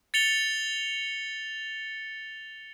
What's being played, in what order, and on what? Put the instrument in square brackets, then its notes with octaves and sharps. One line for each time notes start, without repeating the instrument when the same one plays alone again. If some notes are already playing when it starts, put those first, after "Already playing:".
[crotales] A6 C#7 F7 G7